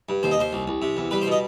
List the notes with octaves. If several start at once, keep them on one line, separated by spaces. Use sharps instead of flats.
G2
D#2 C5
D#5
D#2 C5
C2
C2
C3
E2
G3 B4
C5
B2
D#5